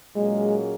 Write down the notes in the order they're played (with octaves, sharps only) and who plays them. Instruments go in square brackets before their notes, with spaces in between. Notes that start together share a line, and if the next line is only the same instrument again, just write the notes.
[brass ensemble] A#2 F#3 A#3 C#4 G#4 [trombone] G#3